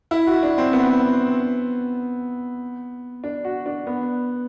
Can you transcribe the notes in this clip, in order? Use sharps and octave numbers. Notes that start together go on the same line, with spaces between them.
E4
F#4
D4
C4
B3
D4
F#4
D4
B3